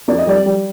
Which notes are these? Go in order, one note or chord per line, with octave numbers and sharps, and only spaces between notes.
F2 D5
D#5
G3 D5
G3